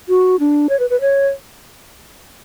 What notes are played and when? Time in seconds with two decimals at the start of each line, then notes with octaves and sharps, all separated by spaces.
0.09 F#4
0.40 D4
0.69 C#5
0.80 B4
0.90 B4
1.01 C#5